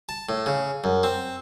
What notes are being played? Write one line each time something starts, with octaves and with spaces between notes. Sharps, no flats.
A5
A2
C#3
F#2
C4